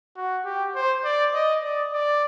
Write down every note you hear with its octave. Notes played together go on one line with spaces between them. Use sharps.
F#4
G4
C5
D5
D#5
D5
D5